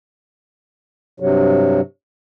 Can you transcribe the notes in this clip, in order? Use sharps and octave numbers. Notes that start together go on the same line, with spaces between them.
G2 C3 F#3